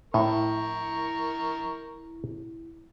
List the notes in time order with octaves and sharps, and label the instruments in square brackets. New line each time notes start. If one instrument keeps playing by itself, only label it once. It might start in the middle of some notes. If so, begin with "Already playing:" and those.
[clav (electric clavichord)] A2 [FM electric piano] E4 [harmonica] A#4 C#6